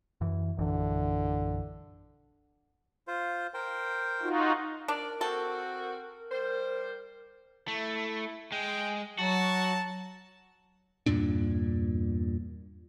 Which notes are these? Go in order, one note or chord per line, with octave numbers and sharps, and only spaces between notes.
F#2 E3
A#1 F#2 D3 E3
F4 C5
A#4 C5 G5
D#4 F4 F#4
D4 A#4 D5
C4 F#4 A4
G3 C5
A3 E4
G#3 G5
F#3 F#4 A5
E2 G2 A#2 D4